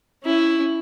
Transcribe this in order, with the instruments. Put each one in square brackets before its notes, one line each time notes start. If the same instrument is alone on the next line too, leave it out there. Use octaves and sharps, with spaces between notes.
[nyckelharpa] C#4 E4